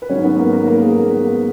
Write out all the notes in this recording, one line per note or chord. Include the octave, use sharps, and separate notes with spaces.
B4
G#2 D#3 F#3 C#4 C#5
B3 B4
A#3 A#4
A#3 A#4
A#3 A#4
G#4
A#3 A#4
B3 B4
A#3 A#4